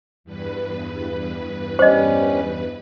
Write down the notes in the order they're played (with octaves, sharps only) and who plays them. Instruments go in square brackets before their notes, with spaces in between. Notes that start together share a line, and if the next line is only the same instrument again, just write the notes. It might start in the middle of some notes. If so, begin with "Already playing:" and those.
[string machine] E2 G2 B4
[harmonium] G3 C#4 [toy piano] C5 D#5